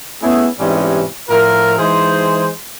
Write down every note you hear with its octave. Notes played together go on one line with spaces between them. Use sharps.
A3 B3 C#4 E4 G#4
G#2 C3 E3 G3 G#3 C#4
A2 F3 F4 A#4
E3 G#3 D#4 G#4 C5